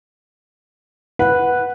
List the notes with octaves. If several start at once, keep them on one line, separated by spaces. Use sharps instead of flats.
B4 F#5